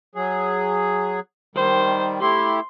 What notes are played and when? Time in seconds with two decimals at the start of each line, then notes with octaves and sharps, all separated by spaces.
0.15 F#3 G#4
1.56 D#3 G3 C5
2.21 A3 E4 G4 C6